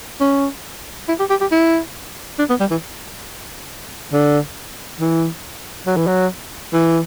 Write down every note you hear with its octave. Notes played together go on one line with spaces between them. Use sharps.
C#4
E4
G4
G4
G4
E4
D4
B3
G3
E3
D3
E3
F#3
E3
F#3
E3